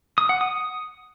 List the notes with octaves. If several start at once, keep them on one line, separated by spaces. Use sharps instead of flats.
D#6
F#5
D#6